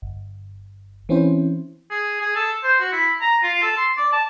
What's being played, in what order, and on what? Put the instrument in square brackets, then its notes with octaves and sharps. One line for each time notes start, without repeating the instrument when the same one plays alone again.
[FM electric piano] G1
E3 C4 C#4 E4 C5
[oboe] G#4
G#4
A4
C5
F#4
E4
A#5
F4
A4
C6
D5
A5